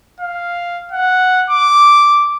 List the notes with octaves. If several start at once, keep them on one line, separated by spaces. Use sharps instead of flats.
F5
F#5
D6